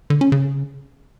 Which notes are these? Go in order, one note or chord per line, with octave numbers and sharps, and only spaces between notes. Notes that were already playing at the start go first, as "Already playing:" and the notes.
D3
C#4
C#3